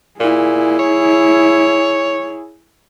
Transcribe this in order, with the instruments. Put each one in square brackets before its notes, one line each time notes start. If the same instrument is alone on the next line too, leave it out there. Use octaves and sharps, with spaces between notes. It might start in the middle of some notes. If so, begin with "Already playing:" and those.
[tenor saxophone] A#2 [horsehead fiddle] E4 G#4
[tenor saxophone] C#5